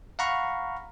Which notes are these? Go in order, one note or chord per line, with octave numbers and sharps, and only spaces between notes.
F5 F#5 A#5 B5 C#6 F6